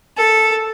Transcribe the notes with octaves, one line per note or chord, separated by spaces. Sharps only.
A4